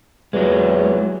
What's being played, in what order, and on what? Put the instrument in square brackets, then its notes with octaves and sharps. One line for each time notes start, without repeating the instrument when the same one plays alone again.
[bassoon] E2 [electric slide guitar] F#3 G#3